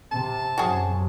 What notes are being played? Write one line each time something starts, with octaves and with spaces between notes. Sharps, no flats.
C3 A5
F#2 C3 F#4 G#4